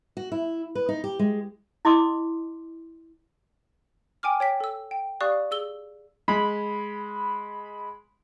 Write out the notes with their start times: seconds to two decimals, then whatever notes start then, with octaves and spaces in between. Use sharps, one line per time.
0.17 F#4
0.32 E4
0.75 B4
0.89 D#4
1.04 G4
1.19 G#3
1.85 E4 D#5 C6 D6 D#6
4.23 G5 G#5 D6 F6
4.40 C#5 G5 B6
4.60 A4 E6
4.91 G5
5.21 G4 D5 F5 C#6 D#6 F#6
5.51 G#4 E6 G7
6.28 G#3 B5